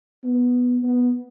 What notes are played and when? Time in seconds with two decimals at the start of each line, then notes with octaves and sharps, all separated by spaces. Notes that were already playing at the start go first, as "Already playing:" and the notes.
0.24 B3
0.83 B3